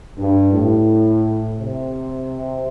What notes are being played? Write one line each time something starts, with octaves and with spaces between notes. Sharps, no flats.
G2
A2
C3